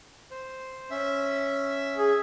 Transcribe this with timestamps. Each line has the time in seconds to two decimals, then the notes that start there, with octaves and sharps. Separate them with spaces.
0.31 C5
0.90 C#4 E5
1.98 G#4